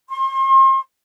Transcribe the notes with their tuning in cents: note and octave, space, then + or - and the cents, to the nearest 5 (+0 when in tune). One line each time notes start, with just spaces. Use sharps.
C6 +40